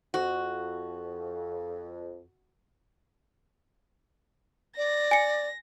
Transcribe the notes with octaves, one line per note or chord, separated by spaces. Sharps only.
F2 F#4
D5 A#6
G#5 C#7